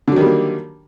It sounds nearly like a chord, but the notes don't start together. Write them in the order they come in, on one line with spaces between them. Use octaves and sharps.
D3 F#3 D#3 G3 A#3